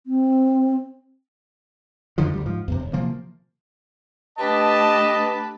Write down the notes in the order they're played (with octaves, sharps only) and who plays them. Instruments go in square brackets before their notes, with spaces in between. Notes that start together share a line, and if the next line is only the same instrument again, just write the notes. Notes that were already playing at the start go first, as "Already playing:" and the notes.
[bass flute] C4
[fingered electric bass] F2 D3 D#3 F3
D2 E3 G3
G#2 F3
E2 G2 C3
D#1
C3 E3 F3 A#3
[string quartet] A3 D4 G4 [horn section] B4 A5 [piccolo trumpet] D#5